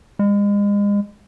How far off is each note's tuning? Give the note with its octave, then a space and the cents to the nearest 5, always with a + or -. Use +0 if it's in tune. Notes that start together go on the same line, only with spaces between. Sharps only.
G#3 -35